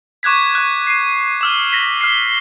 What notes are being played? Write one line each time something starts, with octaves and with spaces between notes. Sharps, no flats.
C#6 D6 F#6 G#6 B6
C#6 F#6
C7 D#7
D6 E6 F6
A#6 B6
F6 C7